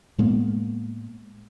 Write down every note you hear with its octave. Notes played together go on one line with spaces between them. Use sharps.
A2 G#3 A#3 B3